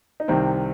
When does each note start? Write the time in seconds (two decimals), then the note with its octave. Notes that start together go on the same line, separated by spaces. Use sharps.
0.20 D#4
0.28 C2 C3 D#3 C4